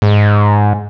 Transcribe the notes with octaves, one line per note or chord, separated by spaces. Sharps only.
G#2